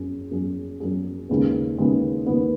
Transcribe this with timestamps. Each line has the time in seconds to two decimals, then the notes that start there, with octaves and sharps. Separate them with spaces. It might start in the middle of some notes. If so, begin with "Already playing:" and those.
Already playing: F#2 F#3 C#4 G#4
0.31 F#2 F#3 C#4 G#4
0.80 F#2 F#3 C#4 G#4
1.29 D#2 C#3 G#3 B3
1.78 D#2 C#3 G#3 B3
2.26 D#2 C#3 G#3 B3